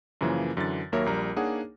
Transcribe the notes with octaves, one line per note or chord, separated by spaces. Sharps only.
F#2 C#3 E3 F3 A#3
F#2 D3 E3 A6
D#2 F#3 A#3 A#4 C#5 E5
A#1 G3 A#4 A#5
A#3 D4 D#4 G#4 C#5 F#5